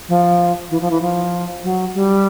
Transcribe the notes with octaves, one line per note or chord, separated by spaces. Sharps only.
F3
E3
F3
E3
F3
F#3
G3